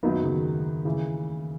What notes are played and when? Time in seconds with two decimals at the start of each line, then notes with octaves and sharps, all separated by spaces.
0.03 F#2 D#3 F#3 A#3 B3 D#4
0.24 C#3
0.34 D#3
0.85 C#3 E3